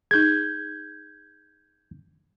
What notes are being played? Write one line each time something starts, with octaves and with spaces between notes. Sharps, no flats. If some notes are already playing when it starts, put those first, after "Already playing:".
D#4 G#4 G6 G#6